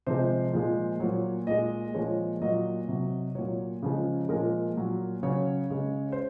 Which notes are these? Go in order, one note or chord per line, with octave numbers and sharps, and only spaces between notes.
C3 F3 G#3 C5
A#2 F3 G#3
A#2 F#3 C#5
A#2 G#3 D#5
A#2 F3 G#3 C#5
A#2 F#3 D#5
C3 F#3
A#2 F#3 C#5
C#3 F3 G#3
A#2 F3 G#3 A#4
A#2 F#3
C#3 F#3 C#5
C#3 G#3
C5